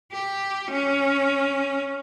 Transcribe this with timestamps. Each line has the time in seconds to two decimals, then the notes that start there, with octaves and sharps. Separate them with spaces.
0.12 G4
0.72 C#4